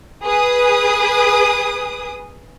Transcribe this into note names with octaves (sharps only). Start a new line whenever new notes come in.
G#4 B4 D#6